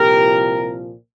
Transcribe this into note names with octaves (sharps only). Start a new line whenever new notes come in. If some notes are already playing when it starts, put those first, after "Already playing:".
Already playing: C2 A#2 F3 G4 A#4